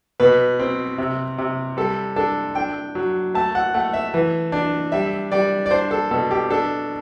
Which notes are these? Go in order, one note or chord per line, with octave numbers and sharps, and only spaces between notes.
B2 B4
C4
C3
C3
G3 A4
D4 A4
D4 G5
F#3
A3 A5
F#5
A3 F#5
E5
E3
D4
G3 E5
G3 D5
D5
D4 C5
A4
B2 A4
G4
D4 A4